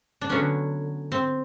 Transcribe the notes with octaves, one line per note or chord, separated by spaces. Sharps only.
D4
D3 F#3 B3 C#4
C4